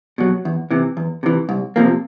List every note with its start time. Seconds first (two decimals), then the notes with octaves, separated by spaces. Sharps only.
0.18 B2 F#3
0.45 E2
0.71 C3 E3
0.97 E2
1.23 C3 E3
1.49 C2
1.76 C3 F3 A#3